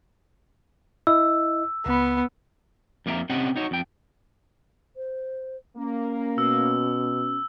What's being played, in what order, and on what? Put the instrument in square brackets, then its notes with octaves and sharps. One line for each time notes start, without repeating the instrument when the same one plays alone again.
[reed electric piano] E4 D#5 [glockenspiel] E6
[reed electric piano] C#2 B5 [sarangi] B3
[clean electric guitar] F2 A#3 E4 F4 E5 A#5
C3 C4 C#4 G4 D#5 F#5
D#4 F#4 C#5
F2 G5
[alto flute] C5
[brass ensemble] A#3 [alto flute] C#4
[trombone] B2 [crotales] E6